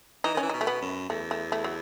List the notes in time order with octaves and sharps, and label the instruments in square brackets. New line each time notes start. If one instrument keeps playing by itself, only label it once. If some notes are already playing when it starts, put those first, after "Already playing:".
[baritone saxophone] E3 [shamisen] D#4
[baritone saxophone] D#3 [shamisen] C#4
[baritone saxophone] E3
[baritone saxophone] B2 [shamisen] D#4
[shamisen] A3
B3
[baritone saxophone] F#2
[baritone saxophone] E2 [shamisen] A3
[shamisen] A3
A3
F#3